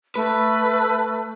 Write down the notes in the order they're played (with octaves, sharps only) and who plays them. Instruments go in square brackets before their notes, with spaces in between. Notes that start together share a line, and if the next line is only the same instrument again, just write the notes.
[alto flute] A3 [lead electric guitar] B4